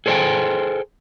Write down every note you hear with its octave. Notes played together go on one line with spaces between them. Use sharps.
G#4 A4 C5 C#5 G5 G#5